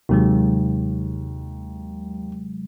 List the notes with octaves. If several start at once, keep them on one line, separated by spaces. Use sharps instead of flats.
D#2 C3 F#3 G#3